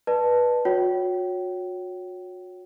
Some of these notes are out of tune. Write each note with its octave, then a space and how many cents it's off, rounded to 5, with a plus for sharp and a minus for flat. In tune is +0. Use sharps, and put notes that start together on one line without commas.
B4 -15 D5 +40 A5 +0
F#4 -35 C#5 +0 G5 -35